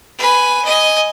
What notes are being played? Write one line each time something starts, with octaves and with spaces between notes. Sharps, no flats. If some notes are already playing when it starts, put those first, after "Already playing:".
B4 G#5
D#5 G#5